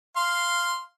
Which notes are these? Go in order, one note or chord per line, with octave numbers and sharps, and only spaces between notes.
F5 C6